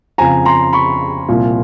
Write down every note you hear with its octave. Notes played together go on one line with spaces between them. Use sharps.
F2 C#3 F3 G#5 A#5
A#5 C6
B5 C#6
C2 A#2 F3